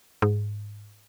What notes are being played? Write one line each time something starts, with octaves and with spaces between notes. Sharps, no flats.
G#2